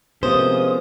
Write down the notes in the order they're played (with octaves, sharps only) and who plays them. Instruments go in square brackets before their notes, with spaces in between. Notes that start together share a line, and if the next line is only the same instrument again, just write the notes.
[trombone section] C3 G#3 A#3 [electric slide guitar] F3 B3 C#4 [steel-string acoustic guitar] C5 [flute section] D#6